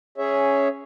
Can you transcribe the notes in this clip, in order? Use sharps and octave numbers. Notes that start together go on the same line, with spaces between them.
C#4 G#4 C#5 E5